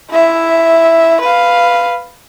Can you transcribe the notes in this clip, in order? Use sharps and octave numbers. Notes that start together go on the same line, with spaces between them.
E4 E5
B4 F5